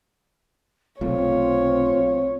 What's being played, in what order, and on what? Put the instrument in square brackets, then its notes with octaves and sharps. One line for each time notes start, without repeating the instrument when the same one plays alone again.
[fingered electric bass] B1 C3 A3 [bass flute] C4 [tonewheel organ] F4 [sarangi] C#5